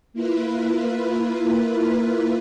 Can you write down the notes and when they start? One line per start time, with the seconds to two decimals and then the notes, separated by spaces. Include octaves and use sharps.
0.13 A#3 E4 F4 B4